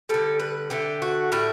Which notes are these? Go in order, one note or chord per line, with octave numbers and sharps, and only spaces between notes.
D3 G3 A4
B4
D3 A3 G4
F#4
A2 G3 E4